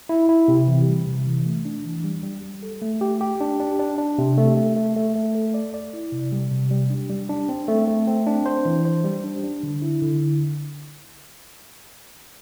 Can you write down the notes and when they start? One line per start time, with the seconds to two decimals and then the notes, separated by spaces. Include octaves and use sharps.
0.09 E4
0.29 E4
0.48 C3
0.68 E3
0.87 G3
1.07 C3
1.27 E3
1.46 A3
1.65 D4
1.85 E3
2.04 G3
2.23 G3
2.43 G3
2.63 A4
2.82 A3
3.01 G4
3.21 G4
3.40 D4
3.60 D4
3.79 D4
3.98 D4
4.18 C3
4.37 A3
4.57 A3
4.76 A3
4.96 A3
5.15 A3
5.35 A4
5.54 D5
5.74 D5
5.93 E4
6.12 C3
6.32 G3
6.51 C3
6.71 G3
6.90 D4
7.10 G3
7.29 D4
7.49 C4
7.68 A3
7.88 A3
8.07 C4
8.27 D4
8.46 C5
8.65 E3
8.85 C5
9.04 G3
9.24 D4
9.43 D4
9.63 D3
9.82 E4
10.02 D3
10.21 E4